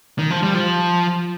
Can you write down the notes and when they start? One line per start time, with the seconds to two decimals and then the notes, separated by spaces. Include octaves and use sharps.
0.19 D#3
0.30 F3
0.43 G3
0.55 F3